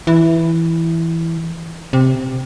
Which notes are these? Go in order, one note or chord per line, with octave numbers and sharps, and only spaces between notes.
E3
C3